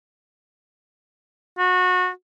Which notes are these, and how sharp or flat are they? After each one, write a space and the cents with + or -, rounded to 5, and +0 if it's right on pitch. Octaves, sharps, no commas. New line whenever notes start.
F#4 -25